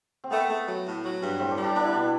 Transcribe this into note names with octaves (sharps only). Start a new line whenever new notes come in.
C4
A3 B3
A3
F#3
A2
F#3
G2
A2 C4
D4
G3
D4
B3 D4
E4
B2 D4